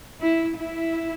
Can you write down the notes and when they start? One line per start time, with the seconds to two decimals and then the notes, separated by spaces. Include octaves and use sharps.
0.20 E4
0.59 E4